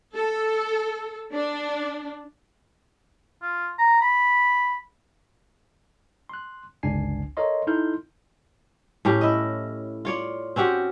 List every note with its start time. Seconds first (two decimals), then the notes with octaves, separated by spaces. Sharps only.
0.15 A4
1.33 D4
3.42 F4
3.79 A#5
4.01 B5
6.29 C6 F#6
6.83 G1 C#2 D4 G#5 C7
7.37 A4 A#4 C#5 D#5 C6
7.67 D#4 E4 A4 C6 F6 G6
9.05 A2 C#4 G4
9.21 E4 D#5
10.05 F4 C#5 D5
10.56 C4 C#4 F#4 G4